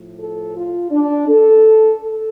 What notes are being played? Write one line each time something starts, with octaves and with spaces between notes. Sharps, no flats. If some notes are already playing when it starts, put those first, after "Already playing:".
Already playing: A2 F3
A4
F4
D4
A4
A4